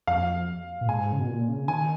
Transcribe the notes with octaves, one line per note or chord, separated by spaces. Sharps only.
F2 F5
A#2
G#2 G#5
C#3
B2
A#2
C#3
D#3 G#5